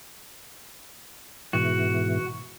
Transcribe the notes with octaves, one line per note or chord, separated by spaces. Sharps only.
G#2 B2 E3 F#4